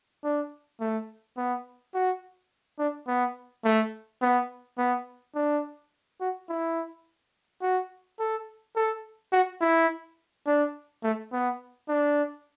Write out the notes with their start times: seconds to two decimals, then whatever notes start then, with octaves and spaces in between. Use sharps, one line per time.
0.24 D4
0.80 A3
1.37 B3
1.94 F#4
2.79 D4
3.08 B3
3.64 A3
4.22 B3
4.78 B3
5.35 D4
6.20 F#4
6.49 E4
7.62 F#4
8.19 A4
8.76 A4
9.33 F#4
9.61 E4
10.46 D4
11.03 A3
11.32 B3
11.89 D4